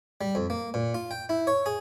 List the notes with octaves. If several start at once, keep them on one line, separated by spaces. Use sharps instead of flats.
G3
F2
A#3
A#2
F4
G5
E4
C#5
G#4